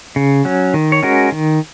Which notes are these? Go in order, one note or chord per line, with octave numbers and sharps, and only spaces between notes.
C#3
F#3 C#4
D#3
C#5
G#3 C#4 F#4 A#4
D#3